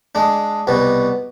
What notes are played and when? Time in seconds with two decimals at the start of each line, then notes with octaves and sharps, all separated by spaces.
0.15 G#3 D4
0.67 C2 B2 G3 B4